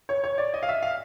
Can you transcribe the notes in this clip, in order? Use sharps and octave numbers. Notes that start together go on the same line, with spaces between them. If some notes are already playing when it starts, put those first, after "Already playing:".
C#5
C#5
D5
D#5
F5
E5
F5